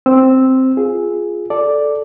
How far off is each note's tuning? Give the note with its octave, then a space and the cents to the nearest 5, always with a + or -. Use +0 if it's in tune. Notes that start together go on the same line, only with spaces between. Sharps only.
C4 +0 E6 -10
F4 +0 G#4 +0
A4 +0 D5 +0